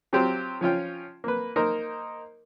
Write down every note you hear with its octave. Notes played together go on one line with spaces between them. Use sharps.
F#3 C4 F4 G4 C5
F3 C#4 F4 G5
A#3 B4
A#3 D#4 A#4 C5